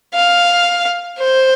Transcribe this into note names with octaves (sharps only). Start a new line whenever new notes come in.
F5
C5